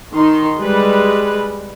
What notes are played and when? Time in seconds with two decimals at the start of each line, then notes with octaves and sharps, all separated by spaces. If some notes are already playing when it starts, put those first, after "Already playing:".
0.13 D#3 D#4 C6
0.59 G3 G#3 B4